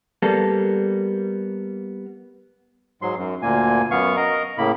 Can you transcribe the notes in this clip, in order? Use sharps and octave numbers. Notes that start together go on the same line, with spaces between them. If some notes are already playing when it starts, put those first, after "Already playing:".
G3 A#3 B3 A4
G#2 F#3 C6
F#2
D2 A#2 A#3 G#5
F#2 B3 F5 C#6
A#4 D#5 A#5
A2 C#3 A#3 B5